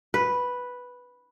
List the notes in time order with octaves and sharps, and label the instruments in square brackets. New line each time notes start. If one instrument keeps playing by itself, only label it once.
[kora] B4